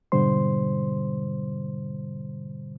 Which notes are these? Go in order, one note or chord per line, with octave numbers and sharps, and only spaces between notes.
G#2 B2 D3 G3 C5 C6